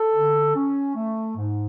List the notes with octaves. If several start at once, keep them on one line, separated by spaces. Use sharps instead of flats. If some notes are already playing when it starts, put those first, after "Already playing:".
Already playing: A4
D3
C#4
A3
G#2